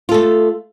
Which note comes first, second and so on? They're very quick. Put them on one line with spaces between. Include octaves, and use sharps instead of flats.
F4 A4 A3